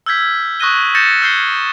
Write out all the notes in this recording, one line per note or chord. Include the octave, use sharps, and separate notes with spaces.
E6 F6 G6 G#6 B6
C#6 D#6 F#6 A#6 D#7 G7
G6 A6 A#6 C#7 E7
E6 F6 G6 G#6 C7 G7